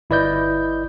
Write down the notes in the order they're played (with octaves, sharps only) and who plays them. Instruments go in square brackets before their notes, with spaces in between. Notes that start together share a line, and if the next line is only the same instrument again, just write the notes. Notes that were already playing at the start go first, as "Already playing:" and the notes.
[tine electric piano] G1 E4 B4 D5 D#5 G6